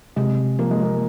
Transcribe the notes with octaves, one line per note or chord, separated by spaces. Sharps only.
C3 G#3
F3 A#3
G#3
A#3